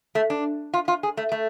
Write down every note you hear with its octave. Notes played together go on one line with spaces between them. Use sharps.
A3
D4
F4
F4
G#4
A3
A3